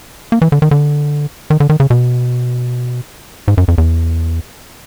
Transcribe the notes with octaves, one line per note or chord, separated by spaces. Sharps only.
A#3
E3
D3
D#3
D3
D#3
D3
D#3
C#3
B2
G#2
F#2
F2
E2